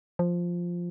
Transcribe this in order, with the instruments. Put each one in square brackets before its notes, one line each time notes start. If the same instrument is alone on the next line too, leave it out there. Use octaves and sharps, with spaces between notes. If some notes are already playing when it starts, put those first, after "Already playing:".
[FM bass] F3